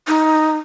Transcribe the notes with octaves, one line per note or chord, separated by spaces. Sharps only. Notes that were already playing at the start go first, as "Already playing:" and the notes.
D#4